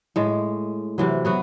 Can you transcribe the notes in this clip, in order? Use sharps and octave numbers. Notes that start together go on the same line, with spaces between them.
A2 G#3
C3 E3 F#3
F#3 B3 F#4